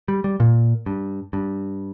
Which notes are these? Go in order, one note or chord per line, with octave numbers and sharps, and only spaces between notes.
G3
G3
A#2
G2
G2